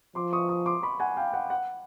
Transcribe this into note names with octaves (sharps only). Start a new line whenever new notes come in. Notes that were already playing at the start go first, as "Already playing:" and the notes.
F3 C6 D6
C#6 D#6
C#6 D#6
C6 D6
B5 C#6
F#5 G#5
F5 G5
F#5
F#5